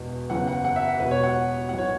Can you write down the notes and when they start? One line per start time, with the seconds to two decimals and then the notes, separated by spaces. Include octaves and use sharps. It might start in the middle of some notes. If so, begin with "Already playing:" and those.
Already playing: E1 E2 B2
0.30 F#1 E2 C#3 F#5
0.48 F#5
0.64 F#5
0.76 E5
0.88 F#5
1.00 E1 E2 B2 B4
1.11 C#5
1.23 F#5
1.69 B1 A2 E3 F#5
1.78 C#5